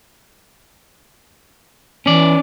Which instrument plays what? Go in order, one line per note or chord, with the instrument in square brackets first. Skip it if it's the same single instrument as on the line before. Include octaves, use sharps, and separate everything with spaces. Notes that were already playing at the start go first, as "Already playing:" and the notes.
[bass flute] E3 [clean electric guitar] C#4 D5